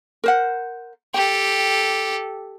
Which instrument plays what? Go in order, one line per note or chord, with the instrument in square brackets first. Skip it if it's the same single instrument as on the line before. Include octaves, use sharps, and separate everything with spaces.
[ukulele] A#4 C5 F#5
[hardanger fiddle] G4 A4 [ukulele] G5